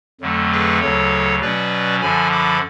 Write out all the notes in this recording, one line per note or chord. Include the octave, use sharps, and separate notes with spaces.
F2 D3 F#3 A3
G#4 B4
D2 C#3 F#3 A4 C#5
B2 F#3 C#4 B4 D5
F#2 D3 F3 G#5 B5
B5 D6